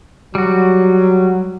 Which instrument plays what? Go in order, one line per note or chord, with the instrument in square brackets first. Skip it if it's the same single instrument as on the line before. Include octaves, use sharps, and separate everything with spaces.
[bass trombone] F#3 [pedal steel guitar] G3 F#4